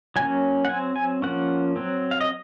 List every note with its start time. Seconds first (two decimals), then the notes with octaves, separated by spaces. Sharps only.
0.16 F#3 A#3 C#4 G#5
0.65 F#5
0.69 F#3 C4 G#5
0.96 G#5
1.22 F3 A#3 C#4 F#5
1.76 F#3 C4
2.11 F5
2.21 D#5